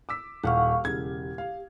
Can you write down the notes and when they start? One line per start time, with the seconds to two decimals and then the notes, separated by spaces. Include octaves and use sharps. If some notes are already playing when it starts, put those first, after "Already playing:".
0.09 D6 E6 B6
0.44 D#1 G4 F5 F#5 C#6 F6
0.84 E1 C#3 G4 G#6
1.38 F5